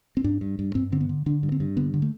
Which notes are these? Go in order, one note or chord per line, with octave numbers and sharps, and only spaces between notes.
C4
G2 D4
G2
G2
G2 C4
D3 C4
B3
D3
D3 D4
G2
C4
G2
D3 B3
D3
A3